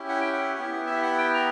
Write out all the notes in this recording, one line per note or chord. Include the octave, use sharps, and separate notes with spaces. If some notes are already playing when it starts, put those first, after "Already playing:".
Already playing: C#4 E4 G4
F#5
G5
F#5
B3 E4 G4
E5
F#5
G5
A#5